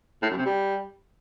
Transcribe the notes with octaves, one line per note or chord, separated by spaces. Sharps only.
A2
F#2
C3
G3